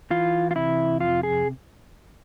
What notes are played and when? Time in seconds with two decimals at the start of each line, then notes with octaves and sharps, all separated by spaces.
0.11 E3 F4
0.51 F4
0.55 C3 E4
1.00 F2 F4
1.23 G#4